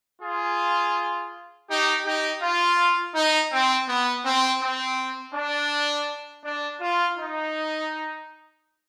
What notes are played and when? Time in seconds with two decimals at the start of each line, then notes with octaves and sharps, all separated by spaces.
0.22 F4 G#4
1.69 D#4 G4
2.05 D#4 G4
2.42 F4
3.15 D#4
3.52 C4
3.88 B3
4.25 C4
4.62 C4
5.34 D4
6.44 D4
6.81 F4
7.18 D#4